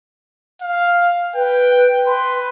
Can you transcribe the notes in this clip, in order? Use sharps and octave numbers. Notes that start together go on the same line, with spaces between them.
F5
B4 G5
B4 C6